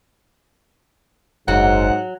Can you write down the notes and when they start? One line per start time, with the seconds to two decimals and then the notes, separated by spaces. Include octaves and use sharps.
1.48 F#1 G#2 F#3 F#5